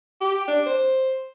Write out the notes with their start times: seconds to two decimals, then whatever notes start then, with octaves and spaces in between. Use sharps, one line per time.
0.21 G4
0.48 D4
0.66 C5